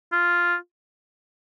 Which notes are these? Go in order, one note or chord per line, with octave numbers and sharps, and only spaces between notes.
F4